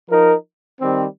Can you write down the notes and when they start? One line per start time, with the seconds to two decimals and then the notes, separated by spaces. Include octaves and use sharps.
0.10 F3 D#4 A#4
0.81 D#3 G3 C4